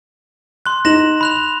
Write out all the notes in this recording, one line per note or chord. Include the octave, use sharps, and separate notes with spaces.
C6 F#6
D#4 A#6 E7 F#7
B5 F#6 F7